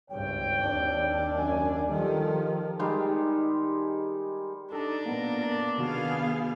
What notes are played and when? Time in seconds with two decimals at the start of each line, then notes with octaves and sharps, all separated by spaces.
0.11 G#1 C#2 G2 C#5 G5
0.62 D#2 D4
1.38 F#2 G#5
1.89 D#3 F3 G3 G4 A4
2.79 D#3 G3 G#3 C6
4.72 D4 D#4 A4 A5
5.06 A#2 A#3 B3 A#4
5.78 C3 D#3 B3 F#4 G#4 F5